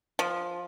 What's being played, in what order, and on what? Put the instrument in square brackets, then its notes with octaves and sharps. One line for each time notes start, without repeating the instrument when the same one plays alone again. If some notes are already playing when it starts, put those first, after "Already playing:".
[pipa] F3